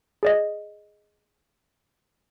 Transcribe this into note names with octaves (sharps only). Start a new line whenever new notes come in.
G#4 D5 D#5